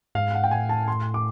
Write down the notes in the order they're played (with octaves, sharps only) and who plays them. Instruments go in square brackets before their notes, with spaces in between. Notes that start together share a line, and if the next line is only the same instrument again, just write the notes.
[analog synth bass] G#2 [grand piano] F5
[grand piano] F#5
G5
[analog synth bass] A2 [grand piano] G#5
[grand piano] A5
C6
D6